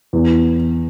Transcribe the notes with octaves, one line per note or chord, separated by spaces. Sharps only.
E2